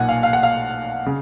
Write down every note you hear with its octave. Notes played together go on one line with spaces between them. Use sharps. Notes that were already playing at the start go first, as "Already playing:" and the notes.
Already playing: B1 A#2 F#5 G#5
F5
F5
F#5
F5
C#3